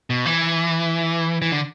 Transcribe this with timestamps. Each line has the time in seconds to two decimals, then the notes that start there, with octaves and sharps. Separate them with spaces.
0.10 B2
0.26 E3
1.42 E3
1.52 D3